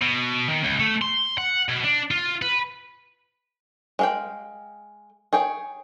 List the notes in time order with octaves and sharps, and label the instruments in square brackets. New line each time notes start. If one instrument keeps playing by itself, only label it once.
[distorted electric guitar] B2
D#3
C#2
A3
C6
F#5
B2
D4
F4
B4
[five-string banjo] G#3 F5 G5
G#4 C#5 G5